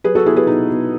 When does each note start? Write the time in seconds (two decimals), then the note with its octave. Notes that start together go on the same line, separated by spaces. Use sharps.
0.04 F#3 G#4 B4
0.15 F#4 A4
0.26 B3 E4 G#4
0.36 G#4 B4
0.47 B2 D#4
0.70 B2